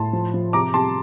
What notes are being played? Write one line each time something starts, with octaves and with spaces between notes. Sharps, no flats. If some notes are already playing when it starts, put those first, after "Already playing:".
Already playing: A2 A5 C6
F3
F3
C3 A#5 D6
C3 A5 C6